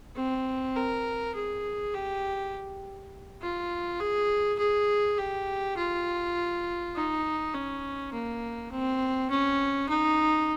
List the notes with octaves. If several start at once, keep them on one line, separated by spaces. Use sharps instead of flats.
C4
A#4
G#4
G4
F4
G#4
G#4
G4
F4
D#4
C#4
A#3
C4
C#4
D#4